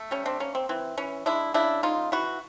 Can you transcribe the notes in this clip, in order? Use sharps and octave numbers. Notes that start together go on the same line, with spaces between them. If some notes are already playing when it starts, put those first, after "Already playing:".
Already playing: A3
G3 C#4
C4 D4
A#3 C#4
C4
E3 C4
E3 C#4
G#3 D4 E4
C#3 D4 E4
G#3 D#4 F4
E3 E4 F#4